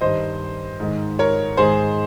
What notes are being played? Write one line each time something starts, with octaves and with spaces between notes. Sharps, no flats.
G2 D#3 C5 D#5
G#2 D#3
A#4 C#5
G#2 D#3 G#4 C5